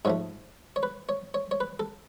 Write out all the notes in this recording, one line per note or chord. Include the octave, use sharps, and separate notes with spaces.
G#2 F3 A3 C#5
C#5
B4
C#5
C#5
C#5
B4
A4